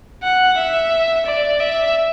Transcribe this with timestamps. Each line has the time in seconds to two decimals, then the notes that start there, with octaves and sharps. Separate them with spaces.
0.24 F#5
0.58 E5
1.26 D5
1.60 E5